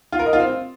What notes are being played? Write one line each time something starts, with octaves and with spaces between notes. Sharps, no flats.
F4
A#4
D#5
F4
C4